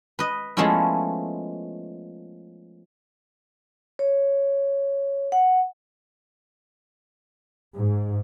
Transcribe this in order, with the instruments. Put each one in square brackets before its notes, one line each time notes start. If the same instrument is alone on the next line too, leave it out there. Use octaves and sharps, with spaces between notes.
[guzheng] B4 D#5
F3 G#3 A3 B3 C#4 E4
[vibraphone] C#5
F#5
[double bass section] G#2